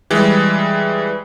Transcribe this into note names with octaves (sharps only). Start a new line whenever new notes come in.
E3 G3 G#3